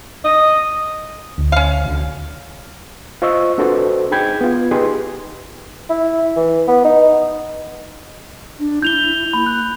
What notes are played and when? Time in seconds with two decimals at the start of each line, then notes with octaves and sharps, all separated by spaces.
0.24 D#5
1.38 D2
1.52 C#4 F5
1.85 D2 D3
3.22 F4 C5 D#5 C#6 E6
3.58 C4 D4 F#4 A4 B4 C5
4.11 D#4 G#4 G5 B5 G6 G#6
4.41 B3 F4
4.71 D#4 G4 G#4 B4 C6
5.90 E4
6.36 E3
6.68 B3
6.85 D#4
8.59 D4
8.82 E4 G6 F7 G7
9.33 A#3 B5
9.46 F#6